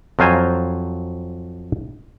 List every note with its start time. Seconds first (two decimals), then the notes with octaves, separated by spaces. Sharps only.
0.19 F2 F#3 F4 C5 G#5 A#5